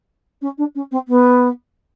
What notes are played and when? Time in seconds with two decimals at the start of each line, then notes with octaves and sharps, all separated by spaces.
0.41 C#4
0.57 D4
0.75 C#4
0.91 C4
1.08 B3